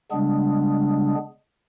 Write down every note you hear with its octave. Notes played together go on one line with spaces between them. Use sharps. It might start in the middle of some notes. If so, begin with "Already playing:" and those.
C#3 G3 G#3 B3 D4 G#4